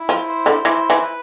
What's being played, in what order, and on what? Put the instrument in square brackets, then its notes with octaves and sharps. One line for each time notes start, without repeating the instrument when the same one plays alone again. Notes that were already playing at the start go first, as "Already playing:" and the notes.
Already playing: [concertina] E4
[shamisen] F3
[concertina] C5
[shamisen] D3
[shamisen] E3 [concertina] E4
[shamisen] E3
[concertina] B4